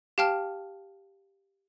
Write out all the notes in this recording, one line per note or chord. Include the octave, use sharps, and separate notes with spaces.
G4 F5 G5 A5 F6